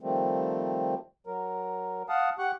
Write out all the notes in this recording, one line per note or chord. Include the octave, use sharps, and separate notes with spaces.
D#3 F3 G3 A3 C4
F#3 A#4
F5 F#5 A5 D#6
G4 F#5 C#6 F#6